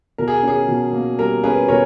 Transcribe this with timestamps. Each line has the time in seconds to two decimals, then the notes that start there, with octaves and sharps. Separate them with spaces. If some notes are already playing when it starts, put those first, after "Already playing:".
0.18 B2 A#4
0.28 G#4
0.43 C#4 G#4
0.68 B2
0.93 A#3
1.18 G3 A#4
1.43 C#4 G#4 B4
1.68 B2 A#4 C#5